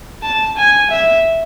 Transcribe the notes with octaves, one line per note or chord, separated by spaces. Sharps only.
A5
G#5
E5